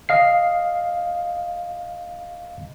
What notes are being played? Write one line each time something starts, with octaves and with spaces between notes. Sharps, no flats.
D#5 F5 C7